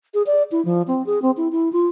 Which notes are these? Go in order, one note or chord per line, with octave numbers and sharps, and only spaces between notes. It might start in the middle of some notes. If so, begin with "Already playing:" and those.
G#4
D5
E4
F3
C4
G#4
C4
E4
E4
F4